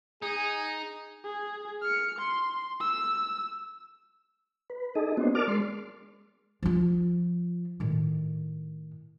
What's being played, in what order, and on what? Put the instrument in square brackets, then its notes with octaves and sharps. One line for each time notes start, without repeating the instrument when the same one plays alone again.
[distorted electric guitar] D#4 [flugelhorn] G#4
[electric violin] G#4
F6 C#7
C6
E6
[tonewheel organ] B4
D#4 G#4 A4 D#5
A#3 B3 C#4 D4 F#4 C5
A#4 D5 A5 D6 F6
G#3 C6
[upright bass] F3 F4
A2 D#3